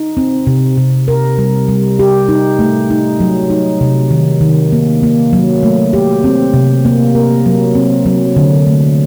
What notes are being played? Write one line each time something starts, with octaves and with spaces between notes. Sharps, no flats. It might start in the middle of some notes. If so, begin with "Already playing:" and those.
Already playing: D#4
C4
C3
C3
A#4
G3
G3
G4
D#4
A3
D#4
F#3
D#4
C3
D#3
D#3
A#3
A#3
F#3
A3
G4
C4
C3
A#3
A#4
F#3
C4
F#3
D3
A3